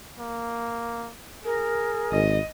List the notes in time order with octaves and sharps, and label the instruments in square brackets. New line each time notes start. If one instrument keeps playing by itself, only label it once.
[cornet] A#3
[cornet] G#4 [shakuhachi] A#4
[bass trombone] G#1 [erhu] D#5